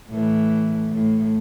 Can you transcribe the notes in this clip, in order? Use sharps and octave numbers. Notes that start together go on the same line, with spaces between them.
A2 E3
A2